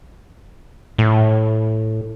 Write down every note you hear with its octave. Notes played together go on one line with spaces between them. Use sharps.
A2